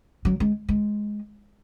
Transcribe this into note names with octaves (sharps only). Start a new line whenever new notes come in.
F#3
G#3
G#3